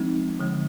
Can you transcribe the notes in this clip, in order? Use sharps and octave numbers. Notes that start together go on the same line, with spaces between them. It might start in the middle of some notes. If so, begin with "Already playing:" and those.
Already playing: F3 G#3 C4 D#4
D3 F3 G#3